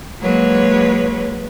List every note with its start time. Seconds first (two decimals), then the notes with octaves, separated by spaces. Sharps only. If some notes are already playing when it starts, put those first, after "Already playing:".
0.21 F#3 G#3 A#3 B4 C#5